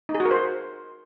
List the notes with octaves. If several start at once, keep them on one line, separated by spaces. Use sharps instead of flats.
D#4
G#4
F#4
A#4
C5